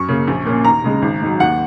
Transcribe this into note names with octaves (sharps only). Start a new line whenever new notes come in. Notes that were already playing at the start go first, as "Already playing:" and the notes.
Already playing: F#2 C#6
C#3 A#3 C#4
A#1
A#2 A#3 C#4
D#2 A#5
C#3 G#3
G#1
G#2 F#3
D#2 F#5